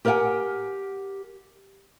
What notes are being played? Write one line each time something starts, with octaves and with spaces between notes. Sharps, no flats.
G4 A#4 D5 F5 F#5 G#5